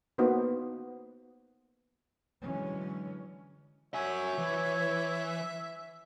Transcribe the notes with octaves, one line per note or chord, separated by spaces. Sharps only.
A#3 B3 D#4 F#4 C5
D3 E3 F#3 G#3 C#4
F#4 C#5 E5 G#5
E3